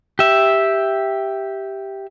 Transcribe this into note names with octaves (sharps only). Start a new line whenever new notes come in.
G4 E5